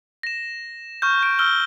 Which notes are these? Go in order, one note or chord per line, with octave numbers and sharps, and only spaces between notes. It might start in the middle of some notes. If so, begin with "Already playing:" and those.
A#6 E7
C#6 F6 G6
G6 D7
E6 F6 G7